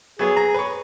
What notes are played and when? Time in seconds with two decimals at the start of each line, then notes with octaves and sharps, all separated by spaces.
0.19 F#3 B3 G#4
0.37 A#5
0.54 B4 C#5